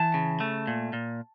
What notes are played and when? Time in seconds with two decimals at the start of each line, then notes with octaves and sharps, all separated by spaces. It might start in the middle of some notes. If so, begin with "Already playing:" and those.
Already playing: E3 A5
0.14 C#3
0.40 A3
0.67 A#2
0.93 A#2